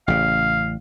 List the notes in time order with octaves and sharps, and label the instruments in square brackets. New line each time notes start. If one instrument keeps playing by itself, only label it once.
[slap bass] A1 C#3 [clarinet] F5